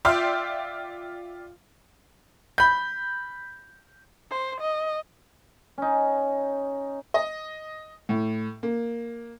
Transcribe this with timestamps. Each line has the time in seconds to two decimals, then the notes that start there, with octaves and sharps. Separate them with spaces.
0.05 F4 D5 E5 G5 C6 F6
2.58 B5 G6
4.30 C5
4.61 D#5
5.78 C#4 D#4
7.14 D#5
8.09 A2
8.63 A#3